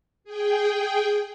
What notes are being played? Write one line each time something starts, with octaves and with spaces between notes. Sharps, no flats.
G#4 G5